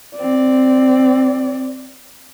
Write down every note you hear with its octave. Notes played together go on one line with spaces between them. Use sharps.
C4 D5